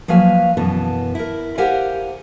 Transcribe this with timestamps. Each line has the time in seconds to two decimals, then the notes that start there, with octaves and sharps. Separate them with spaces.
0.08 F3 F#3 A#3 B4 F5 G#5
0.57 F#2 B2 E3 B3 A5
1.15 E4 A#4
1.58 G4 A#4 C5 F5 F#5 G#5